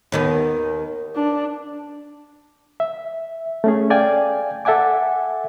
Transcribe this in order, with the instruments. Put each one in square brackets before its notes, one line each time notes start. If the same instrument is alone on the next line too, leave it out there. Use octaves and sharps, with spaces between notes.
[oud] D#2 D#3 B3
[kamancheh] D4
[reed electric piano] E5
A3 C#4 G#4
D5 F5 G5 G#5
A4 E5 F#5 G#5 D6